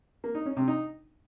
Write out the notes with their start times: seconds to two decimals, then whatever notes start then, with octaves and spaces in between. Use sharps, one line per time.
0.24 A#3
0.35 D#4
0.46 C#4
0.57 C3
0.68 D#4